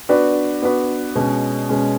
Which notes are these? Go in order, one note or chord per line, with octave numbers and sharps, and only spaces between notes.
B3 D4 F#4 B4 D5
B3 D4 F#4 B4 D5
B2 G#3 C#4
B2 G#3 C#4